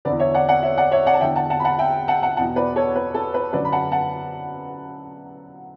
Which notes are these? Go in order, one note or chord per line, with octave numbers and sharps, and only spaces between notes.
E2 D3 B4 D5
C#5 E5
D5 F#5
D5 F#5
C#5 E5
D5 F#5
C#5 E5
D5 F#5
A5
E2 D3 E5 G5
F#5 A5
F#5 A5
B5
F#5 A5
E5 G5
F#5 A5
F#5 A5
E2 B2 F#5 A5
B4 D5
A4 C#5
B4
A4
B4
F#2 D3 B4 D5
B5
F#5 A5
F#5 A5